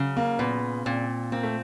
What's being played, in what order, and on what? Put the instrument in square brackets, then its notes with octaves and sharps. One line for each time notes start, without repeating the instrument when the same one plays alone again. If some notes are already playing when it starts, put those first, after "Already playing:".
Already playing: [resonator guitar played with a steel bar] C#3 F#3
[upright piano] A#3
[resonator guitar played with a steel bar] A#2 [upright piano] B3
[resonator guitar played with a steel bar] A#2 [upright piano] C4
[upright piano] A#3 [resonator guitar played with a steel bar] C4
[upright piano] A3